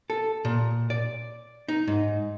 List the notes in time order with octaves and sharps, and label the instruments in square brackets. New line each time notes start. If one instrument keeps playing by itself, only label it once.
[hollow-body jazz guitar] A4
A#2
D5
D#4
G#2